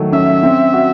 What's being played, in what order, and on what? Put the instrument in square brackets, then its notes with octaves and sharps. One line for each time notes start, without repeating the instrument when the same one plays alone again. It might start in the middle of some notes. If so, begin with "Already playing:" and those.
Already playing: [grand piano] D#3 F#3 A3
[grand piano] C#4 [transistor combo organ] E5
[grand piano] C4
F#4